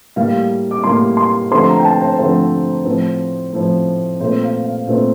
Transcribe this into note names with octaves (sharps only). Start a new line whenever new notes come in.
A2 G3 A#3 F5
D6
A2 G3 A#3 C6
C6
D3 F3 A3 C4 C6
A#5
G5
A5
C5
D3 F3 A3 C4 C5
A2 F3 C4
A2 F3 C4
A#2 A3 C4 C5
F5
F5
A#2 A3 C4